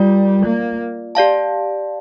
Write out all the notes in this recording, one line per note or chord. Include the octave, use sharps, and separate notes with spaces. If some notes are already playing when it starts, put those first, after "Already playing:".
Already playing: G3 F4 A#4 D5
A#3
G4 D5 F5 A5